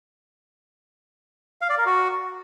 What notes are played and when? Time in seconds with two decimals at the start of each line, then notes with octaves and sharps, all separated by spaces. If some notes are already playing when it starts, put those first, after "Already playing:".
1.62 F5
1.70 D5
1.78 A#4
1.86 F#4